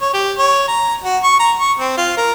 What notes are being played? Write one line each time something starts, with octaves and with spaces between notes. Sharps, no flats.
C#5
G4
C#5
A#5
F#4
C#6
A#5
C#6
C4
F4
A#4